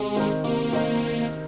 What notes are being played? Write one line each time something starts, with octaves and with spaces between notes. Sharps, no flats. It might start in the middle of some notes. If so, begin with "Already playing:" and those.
Already playing: C3 G#3
D#3 C4 D#4 A#4
C3 A#3
D#3 C4 D#4 A#4